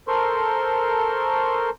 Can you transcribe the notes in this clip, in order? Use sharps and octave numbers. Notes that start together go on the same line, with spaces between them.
A4 A#4 C5 C6 C#6